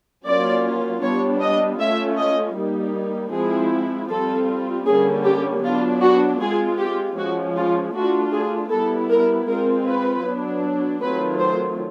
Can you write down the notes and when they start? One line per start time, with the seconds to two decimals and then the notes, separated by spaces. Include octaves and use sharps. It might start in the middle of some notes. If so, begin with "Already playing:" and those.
0.25 F#3 A#3 C#4 F4 D5
1.02 G3 B3 D4 C#5
1.41 D#5
1.79 A3 C#4 F4 E5
2.18 D#5
2.56 G3 A#3 D#4
3.32 F3 G#3 C4 E4 G#4
4.09 G3 C4 F4 A4
4.86 D3 G3 A#3 C#4 G#4
5.24 G4
5.64 F#3 B3 D4 F4
6.02 F#4
6.41 G#3 C4 F4 G#4
6.78 G4
7.17 F3 G#3 C#4 F#4
7.56 F4
7.94 A3 D4 F4 F#4
8.33 G#4
8.70 G3 B3 E4 A4
9.10 A#4
9.47 G#3 C4 F4 A#4
9.86 B4
10.24 F#3 B3 D4
11.02 D#3 F#3 A3 C4 F4 B4
11.40 C5